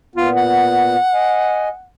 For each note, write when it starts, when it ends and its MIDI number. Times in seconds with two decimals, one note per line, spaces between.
0.16 0.96 46
0.16 0.96 59
0.16 0.30 65
0.37 1.87 78
1.14 1.68 75
1.14 1.68 80